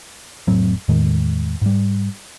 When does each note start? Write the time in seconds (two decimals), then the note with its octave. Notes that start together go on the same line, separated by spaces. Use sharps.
0.47 F1 A2 F#3 C4
0.88 E2 A2 D#3 G#3
1.61 G#2 G3